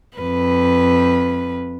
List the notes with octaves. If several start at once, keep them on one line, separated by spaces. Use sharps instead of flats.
F2 B4